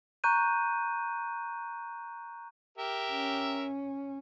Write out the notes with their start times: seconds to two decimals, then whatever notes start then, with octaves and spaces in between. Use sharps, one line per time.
0.24 A#5 C#6 F#6 G6 D#7
2.78 G4 A#4 E5
3.11 C#4